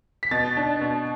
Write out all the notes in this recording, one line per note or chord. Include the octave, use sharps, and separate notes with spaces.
B6
B2 A6
D4
B2